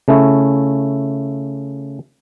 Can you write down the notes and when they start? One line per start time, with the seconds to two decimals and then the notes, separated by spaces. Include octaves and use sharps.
0.08 C#3 A3 C#4 E4